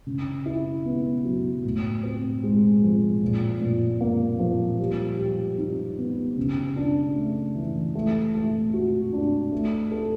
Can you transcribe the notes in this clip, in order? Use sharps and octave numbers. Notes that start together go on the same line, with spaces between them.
C#3
E4
B3
F#3
A2
C4
G#3
F3
A#2
A#2
A#3
F3
G3
G4
D#4
B3
C#3
D4
A3
E3
A3
A3
F#4
D4
A3
A4